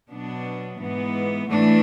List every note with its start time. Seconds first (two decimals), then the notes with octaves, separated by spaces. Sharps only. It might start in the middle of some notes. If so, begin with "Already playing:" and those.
0.11 B2 F#3 B3 D4
0.80 G#2 E3 B3
1.50 A2 E3 A3 D4